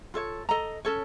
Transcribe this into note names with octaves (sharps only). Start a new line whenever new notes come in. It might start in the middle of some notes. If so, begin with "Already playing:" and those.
F4 A4 C#5
A4 D#5 A#5
C#4 A4 C#5